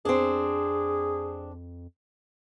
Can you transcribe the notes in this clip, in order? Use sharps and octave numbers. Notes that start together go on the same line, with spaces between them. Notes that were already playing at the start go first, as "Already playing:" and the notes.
F2 C4 D4 G#4